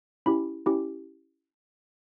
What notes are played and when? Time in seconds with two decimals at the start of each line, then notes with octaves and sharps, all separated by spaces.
0.26 C#4 E4 G4 B5
0.66 C#4 E4 G4